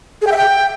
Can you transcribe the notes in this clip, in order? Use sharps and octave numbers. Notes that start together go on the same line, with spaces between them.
G#4
G5
E5
G5